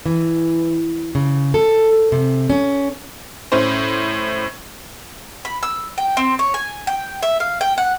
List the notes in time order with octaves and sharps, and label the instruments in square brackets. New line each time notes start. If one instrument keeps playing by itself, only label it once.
[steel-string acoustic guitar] E3
C#3
A4
C3
C#4
[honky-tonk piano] A2 C#4 C5
[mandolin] B5
E6
G5
C4
C#5
G#5
G5
E5
F5
G5
F#5